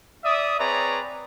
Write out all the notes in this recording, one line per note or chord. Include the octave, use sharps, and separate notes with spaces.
D5 E5 D#6
C4 G#4 B4 C#5 D5 A#5